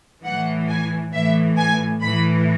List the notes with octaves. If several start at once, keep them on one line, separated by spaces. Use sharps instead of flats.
A2 E3 F#5
G#5
A2 E3 E5
G#5
A2 E3 B5